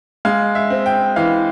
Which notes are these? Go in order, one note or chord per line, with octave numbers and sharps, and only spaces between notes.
G#3 F5
E5
C4
G5
E3 F5